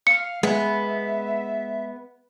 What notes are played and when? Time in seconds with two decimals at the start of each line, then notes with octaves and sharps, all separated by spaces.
0.07 F5 C#7
0.43 G#3 B3 E5